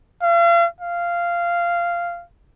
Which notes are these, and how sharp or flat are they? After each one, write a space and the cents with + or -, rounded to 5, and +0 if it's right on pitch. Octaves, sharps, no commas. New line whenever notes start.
F5 -40
F5 -10